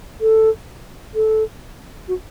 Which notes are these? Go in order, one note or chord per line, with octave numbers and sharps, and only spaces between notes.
A4
A4
F#4